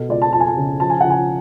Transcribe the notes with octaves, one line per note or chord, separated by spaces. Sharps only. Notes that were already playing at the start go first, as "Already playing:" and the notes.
Already playing: B2 A4
C#2 D5
A5
F2 A5
G#5
A5
C#3
F3 A5
G#5
C#3 F#5
G#5